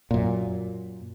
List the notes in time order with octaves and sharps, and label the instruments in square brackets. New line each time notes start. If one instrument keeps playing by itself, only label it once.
[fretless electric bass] F#2 A#2